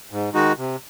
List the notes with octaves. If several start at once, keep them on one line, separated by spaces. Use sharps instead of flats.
G#2
D#3 G#3 D#4 F#4
C3